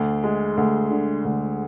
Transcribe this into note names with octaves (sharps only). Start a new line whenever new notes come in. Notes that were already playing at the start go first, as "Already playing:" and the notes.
Already playing: D2
G#3
D2
D3
D2